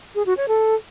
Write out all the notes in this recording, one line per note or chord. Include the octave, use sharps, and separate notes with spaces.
G#4
F#4
C#5
A4